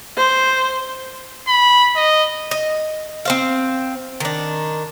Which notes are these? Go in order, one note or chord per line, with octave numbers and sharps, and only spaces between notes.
C5
B5
D#5
D#5
C4 C5 F5
D#3 D4